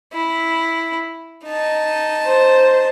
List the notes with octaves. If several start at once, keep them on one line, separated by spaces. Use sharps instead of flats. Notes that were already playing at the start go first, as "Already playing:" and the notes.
E4
D#4 A5
C5